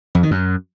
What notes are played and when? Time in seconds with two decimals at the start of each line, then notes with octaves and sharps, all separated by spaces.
0.15 F2
0.23 D#3
0.31 F#2